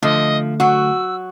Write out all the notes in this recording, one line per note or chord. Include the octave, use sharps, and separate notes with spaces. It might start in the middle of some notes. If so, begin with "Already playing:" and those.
D3 F3 A3 D#5
F#3 F#4 E6